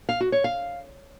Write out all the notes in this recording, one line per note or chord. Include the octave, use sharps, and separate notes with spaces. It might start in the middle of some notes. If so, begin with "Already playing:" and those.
F5
F#4
C#5
F5